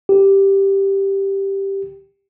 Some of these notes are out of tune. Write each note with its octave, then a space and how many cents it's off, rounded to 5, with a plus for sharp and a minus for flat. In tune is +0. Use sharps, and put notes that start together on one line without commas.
G4 +0